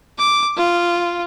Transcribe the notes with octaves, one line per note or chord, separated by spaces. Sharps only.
D6
F4